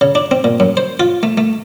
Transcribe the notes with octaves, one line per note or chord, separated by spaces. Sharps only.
C#3
D4
C4
A#2
F#2
C5
F4
A3
A3